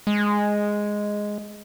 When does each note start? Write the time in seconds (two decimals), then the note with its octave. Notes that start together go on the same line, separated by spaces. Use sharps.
0.07 G#3